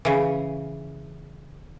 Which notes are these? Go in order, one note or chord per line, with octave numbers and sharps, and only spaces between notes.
C#3 E3